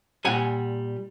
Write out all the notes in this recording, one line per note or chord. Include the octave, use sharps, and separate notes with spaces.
A#2 G3 F#5 G#5